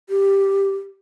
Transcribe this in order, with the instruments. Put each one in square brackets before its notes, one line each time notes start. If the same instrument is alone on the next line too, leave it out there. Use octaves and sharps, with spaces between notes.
[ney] G4